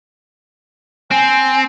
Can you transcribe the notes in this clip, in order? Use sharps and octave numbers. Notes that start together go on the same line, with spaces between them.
C4 G#5